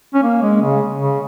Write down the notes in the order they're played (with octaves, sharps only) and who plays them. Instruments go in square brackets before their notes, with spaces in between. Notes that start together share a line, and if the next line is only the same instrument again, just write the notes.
[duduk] C#4
A#3
G#3
C#3
C#3